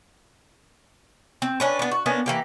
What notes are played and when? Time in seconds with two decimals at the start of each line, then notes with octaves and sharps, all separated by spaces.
1.42 C4
1.60 C#4 D4 B4
1.79 B3 D4
1.91 F#4
2.06 A#3 B3 C#4 D4
2.26 E3 A#3 G4